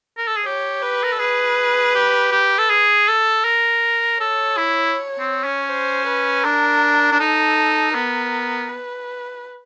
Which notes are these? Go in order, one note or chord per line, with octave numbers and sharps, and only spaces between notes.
A#4
A4
G#4
G4 C#5
B4
A#4
A4
G#4 B4
G4
G4
A4
G#4
A4
A#4
A4 C#5
E4
C4
C#4
C5
B4
D4 A#4
D4
D#4 A4
B3 A#4
B4